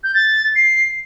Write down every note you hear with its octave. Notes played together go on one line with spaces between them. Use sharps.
G6
A6
C7